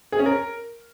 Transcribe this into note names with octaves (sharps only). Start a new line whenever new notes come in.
G#4
C#4
A#4